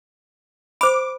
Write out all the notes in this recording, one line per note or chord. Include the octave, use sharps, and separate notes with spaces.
C5 B5 D6